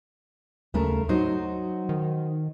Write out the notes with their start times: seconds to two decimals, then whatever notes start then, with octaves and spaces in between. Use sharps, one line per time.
0.74 D#2 C#3 A3 A#4
1.09 F#3 D#4 F#4 C5
1.89 D#3